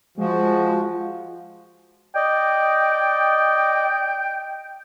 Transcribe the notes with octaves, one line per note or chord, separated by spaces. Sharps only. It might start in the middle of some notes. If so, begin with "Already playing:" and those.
F3 G#3 F#4
D5 D#5 G5